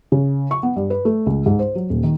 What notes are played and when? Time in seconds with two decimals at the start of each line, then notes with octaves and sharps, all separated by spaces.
0.12 C#3
0.51 C#6
0.63 B3
0.76 G2
0.90 B4
1.05 A3
1.26 C#2
1.46 G#2
1.59 C5
1.75 F#3
1.90 D#1
2.03 D#3